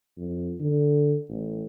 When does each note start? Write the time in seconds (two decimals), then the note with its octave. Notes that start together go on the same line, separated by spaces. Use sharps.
0.17 F2
0.60 D3
1.29 A1